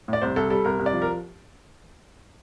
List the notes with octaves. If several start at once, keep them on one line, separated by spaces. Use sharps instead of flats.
A2 D5
C2 C5
C2 A4
G3 A4
C2 A#4
C2
D5
F3
A#4